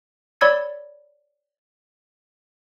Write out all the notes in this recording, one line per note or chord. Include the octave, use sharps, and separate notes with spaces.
C#5 D5 B5 E6 G#6 C#7